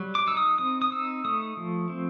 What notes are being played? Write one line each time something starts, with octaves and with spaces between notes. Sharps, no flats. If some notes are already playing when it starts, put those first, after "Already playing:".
Already playing: F#3 G3
D6
D#4 E6
D#6
C4 D#6
D#6
D#4 E6
A3 D#6
F3
C4